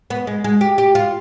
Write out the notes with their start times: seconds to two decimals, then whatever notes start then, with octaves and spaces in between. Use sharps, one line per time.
0.10 B3
0.27 G#3
0.44 G#3
0.61 G4
0.78 G4
0.95 F4